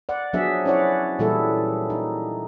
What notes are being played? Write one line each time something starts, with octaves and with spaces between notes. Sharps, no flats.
D5 F#5
F3 F#3 B3 D4 G#4 E5
C#4 E4 C#5 D5 F#5
A#2 E3 G3 E4 G#4 A4
D#4